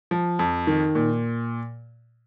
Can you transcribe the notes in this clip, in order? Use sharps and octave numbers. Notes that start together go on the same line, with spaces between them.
F3
F2
D#3
A#2